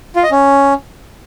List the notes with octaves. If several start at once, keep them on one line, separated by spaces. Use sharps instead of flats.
F4
D#5
C#4